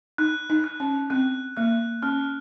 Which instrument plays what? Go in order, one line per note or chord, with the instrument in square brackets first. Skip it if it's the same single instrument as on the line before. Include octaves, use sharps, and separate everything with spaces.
[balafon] D#4 [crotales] F#6
[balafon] D#4
[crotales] F#6
[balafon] C#4
[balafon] C4 [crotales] F#6
[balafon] A#3 [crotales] F#6
[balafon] C#4 [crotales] F6